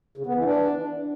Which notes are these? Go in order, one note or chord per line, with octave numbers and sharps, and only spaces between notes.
C#3
B3
E3
D4